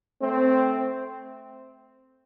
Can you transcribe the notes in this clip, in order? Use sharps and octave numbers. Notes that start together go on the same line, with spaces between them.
A3 C4